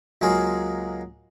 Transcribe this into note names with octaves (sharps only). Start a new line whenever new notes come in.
C#2 F#3 G#3 A#3 G#4 F5